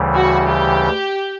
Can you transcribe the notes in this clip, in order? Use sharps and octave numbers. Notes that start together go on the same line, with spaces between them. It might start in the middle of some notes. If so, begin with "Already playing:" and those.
Already playing: D2 C#3 E3 G3
F#4
G4